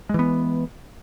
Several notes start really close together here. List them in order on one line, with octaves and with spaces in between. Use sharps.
G#3 E3 B3